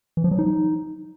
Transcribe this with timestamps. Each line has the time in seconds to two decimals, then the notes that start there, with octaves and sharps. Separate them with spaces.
0.17 E3
0.24 F3
0.31 F#3
0.39 D#4